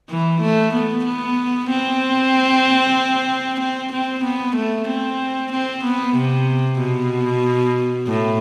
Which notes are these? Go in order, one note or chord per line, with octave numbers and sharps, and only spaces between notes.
E3
A3
B3
B3
C4
C4
C4
B3
A3
C4
C4
B3
C3
B2
A2